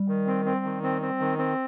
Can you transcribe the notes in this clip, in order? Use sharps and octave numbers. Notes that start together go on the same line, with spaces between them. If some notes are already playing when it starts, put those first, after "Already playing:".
Already playing: G3
D#3
C4
C4
D#3
C4
C4
D#3
C4